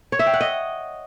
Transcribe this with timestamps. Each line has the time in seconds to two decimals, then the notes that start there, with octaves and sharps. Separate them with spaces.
0.12 C#5
0.19 E5
0.26 G5
0.33 F#5
0.41 D#5